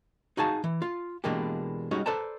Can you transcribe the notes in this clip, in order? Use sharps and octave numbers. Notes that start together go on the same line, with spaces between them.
D#4 F#4 G#4 F5 A5
E3
F4
B2 E3 G#3 A#3 D4 G4
G3 G#3 C#4 D#4 F#4
A4 B4 C5 D5 A5 A#5